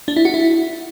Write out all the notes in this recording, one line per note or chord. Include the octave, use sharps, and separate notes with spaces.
D4
E4
F#4
E4